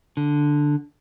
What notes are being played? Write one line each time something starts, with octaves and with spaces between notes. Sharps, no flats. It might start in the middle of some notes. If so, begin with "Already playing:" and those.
D3